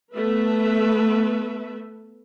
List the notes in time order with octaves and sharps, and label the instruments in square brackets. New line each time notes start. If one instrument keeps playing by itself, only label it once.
[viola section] A3 B3 B4 E5